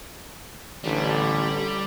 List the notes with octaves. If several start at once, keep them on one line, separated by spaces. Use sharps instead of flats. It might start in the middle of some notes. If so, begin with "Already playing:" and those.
A1 D3 G3